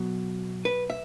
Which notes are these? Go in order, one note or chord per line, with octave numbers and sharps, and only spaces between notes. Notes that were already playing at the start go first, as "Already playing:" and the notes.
Already playing: B2 F#3
B4
E5